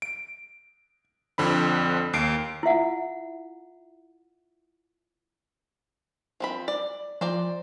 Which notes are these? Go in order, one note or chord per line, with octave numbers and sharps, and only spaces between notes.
D7
F2 D3 C4 B5
D#2 C7 D7
E4 F4 E5 F#5
F3 C4 B5
D5
F3 C5 D5 A#5